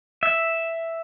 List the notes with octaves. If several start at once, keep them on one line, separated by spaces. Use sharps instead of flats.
E5